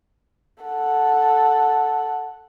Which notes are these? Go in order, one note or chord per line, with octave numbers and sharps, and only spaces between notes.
A4 F#5